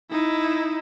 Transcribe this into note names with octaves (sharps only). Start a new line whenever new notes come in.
D#4 E4